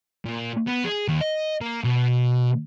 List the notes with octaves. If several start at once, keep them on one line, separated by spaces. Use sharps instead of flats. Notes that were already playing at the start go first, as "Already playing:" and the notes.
A#2
B3
G#4
D#2
D#5
A#3
B2